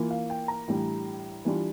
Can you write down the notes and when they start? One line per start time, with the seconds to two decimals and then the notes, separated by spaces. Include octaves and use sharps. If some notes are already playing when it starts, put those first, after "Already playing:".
Already playing: E3 A#3 F4
0.11 F5
0.30 G5
0.48 A#5
0.68 A2 E3 G3 D4
1.45 E3 G3 D4 F4